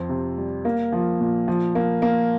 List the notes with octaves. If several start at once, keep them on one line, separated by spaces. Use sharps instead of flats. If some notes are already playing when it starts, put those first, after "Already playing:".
Already playing: F2 C4
C3
G3
A#3
F3
A#2
F3
A#3
A#3